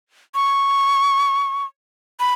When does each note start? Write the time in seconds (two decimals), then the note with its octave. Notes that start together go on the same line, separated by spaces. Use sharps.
0.35 C#6
2.20 B5